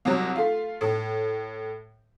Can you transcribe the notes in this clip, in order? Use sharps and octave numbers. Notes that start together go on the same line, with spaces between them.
C2 F#3
A3 F4
A2